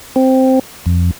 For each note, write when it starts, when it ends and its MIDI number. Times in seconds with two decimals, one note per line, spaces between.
0.16 0.59 60
0.86 1.11 41